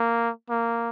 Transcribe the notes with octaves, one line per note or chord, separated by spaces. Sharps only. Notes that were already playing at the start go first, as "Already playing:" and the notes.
Already playing: A#3
A#3